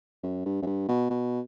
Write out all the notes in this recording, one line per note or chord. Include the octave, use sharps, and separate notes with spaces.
F#2
G2
F#2
G2
B2
B2